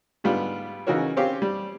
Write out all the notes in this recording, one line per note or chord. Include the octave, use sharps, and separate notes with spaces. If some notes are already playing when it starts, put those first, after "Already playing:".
G#2 D3 G3 B3 F4
C#3 E3 D#4 F#4 A#4 C#5
C4 C#4 G4 F5
G3